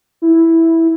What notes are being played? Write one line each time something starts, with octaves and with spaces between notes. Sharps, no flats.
E4